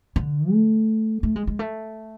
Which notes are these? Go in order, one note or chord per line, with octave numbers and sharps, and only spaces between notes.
D3
A3
A3
G#3
G#3
A3